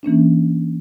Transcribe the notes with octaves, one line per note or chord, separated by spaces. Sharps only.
E3 A#3 C#4 D4